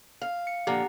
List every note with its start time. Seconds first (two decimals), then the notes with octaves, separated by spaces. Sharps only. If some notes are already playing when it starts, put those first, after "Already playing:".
0.22 F5
0.47 C#7
0.67 A#2 D3 F3 G4 F#5 A#5